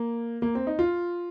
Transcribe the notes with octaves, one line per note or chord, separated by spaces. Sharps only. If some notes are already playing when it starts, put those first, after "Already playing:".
Already playing: A#3
A#3
C4
D#4
F4